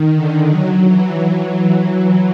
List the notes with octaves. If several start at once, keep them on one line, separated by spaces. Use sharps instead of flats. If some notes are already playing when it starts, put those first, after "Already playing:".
Already playing: D#3
D3
F#3
E3